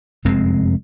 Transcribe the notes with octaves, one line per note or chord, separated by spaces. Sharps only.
F1 F#2 G#3 C4